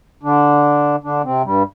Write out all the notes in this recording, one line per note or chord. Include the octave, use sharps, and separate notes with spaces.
D3 D4
D3 D4
C3 C4
G2 G3